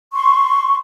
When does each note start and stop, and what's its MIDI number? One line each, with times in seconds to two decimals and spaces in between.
0.13 0.76 84
0.13 0.76 85